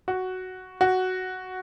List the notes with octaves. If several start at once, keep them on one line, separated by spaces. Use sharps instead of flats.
F#4
F#4